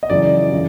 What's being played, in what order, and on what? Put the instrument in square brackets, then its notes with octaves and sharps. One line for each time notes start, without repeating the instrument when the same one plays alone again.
[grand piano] D#5
F#2 C#3 E3 D5
C#3 E3